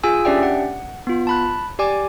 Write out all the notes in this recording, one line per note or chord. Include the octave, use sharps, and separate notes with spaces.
F4 G#4 G#5 E6
C#4 D4 G4 D5 E5 G5
F#5
B3 F4
A5 B5 F#6
G4 D5 G#5 D6